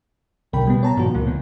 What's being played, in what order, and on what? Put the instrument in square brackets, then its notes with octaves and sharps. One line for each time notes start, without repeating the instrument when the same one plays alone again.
[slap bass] B1 D3 F#3 [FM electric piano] A#4 G5 B5
[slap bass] B2 [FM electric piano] G3 B3
[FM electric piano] C#5 A5 A#5
[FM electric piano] G2 F#4 [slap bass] A#2 D#3 F3
[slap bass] C#2 E3 [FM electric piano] A#3
[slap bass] A#2 [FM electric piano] B3